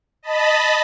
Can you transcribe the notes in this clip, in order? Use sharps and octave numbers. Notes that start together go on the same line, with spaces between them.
D#5 A5 B5